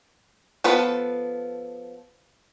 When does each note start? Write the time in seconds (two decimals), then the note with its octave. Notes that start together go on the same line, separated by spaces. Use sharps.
0.64 F3 B3 A4 B4